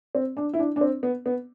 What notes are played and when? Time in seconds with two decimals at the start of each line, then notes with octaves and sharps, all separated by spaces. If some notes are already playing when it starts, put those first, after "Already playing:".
0.15 C4
0.37 D4
0.54 E4
0.59 D4
0.76 D4
0.81 C4
1.03 B3
1.26 B3